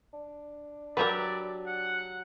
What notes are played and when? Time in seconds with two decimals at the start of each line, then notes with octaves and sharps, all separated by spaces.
0.13 D4
0.97 F#3 G4 A#4 B4 D5 E5
1.67 F#5